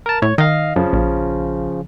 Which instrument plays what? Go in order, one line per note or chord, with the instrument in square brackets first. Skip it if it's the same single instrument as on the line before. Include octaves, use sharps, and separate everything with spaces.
[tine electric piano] A#4 A5
[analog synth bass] A2 [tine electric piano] C#5
[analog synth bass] D#3 [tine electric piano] D#5 F5
[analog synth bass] F#2 [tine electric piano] C#3 F3
[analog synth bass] A#1